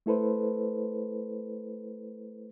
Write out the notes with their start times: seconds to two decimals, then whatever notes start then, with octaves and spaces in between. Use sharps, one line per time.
0.06 A3 E4 A4 B4 C5